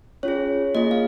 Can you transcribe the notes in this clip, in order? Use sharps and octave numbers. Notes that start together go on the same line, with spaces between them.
C#4 F4 G#4 C#5
A#3 F4 G#4 D#5
F5